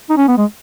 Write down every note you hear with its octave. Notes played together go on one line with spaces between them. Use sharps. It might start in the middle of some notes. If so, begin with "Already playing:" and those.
D#4
C#4
B3
G#3